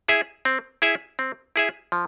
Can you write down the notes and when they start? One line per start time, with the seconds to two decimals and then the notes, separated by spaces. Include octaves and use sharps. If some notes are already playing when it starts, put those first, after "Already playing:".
0.08 E4 G#4 E5
0.45 C4
0.82 E4 G#4 E5
1.19 C4
1.56 E4 G#4 E5
1.92 F3